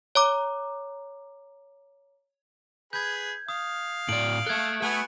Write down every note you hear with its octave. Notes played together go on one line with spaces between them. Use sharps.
C#5 A#5 D6
G#4 B4 B5 G6 G#6
F5 D#6
A2 D5 D7 F#7
A4 E5 F#6 G#6
A3 B3 F#4 G#5